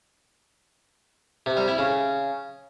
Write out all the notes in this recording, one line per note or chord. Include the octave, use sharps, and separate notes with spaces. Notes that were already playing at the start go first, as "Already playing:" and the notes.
C3
G3
E4
C#3